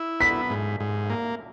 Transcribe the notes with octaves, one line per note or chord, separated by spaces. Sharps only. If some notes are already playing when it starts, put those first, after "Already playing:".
Already playing: E4
B3 B6
G#2
G#2
A#3